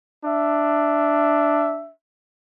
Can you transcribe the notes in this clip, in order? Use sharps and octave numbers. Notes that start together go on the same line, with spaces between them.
D4 E5